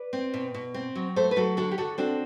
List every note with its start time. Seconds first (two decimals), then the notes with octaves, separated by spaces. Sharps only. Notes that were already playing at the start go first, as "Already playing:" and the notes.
Already playing: B4 D5
0.13 C4
0.34 B2
0.54 B2
0.74 C4
0.95 F#3
1.16 A3 A4 C5
1.31 B4
1.36 F#3 F#4 A4
1.57 D3 F#4 A4
1.71 G4
1.78 D3 F#4 A4
1.98 C4 D4 F#4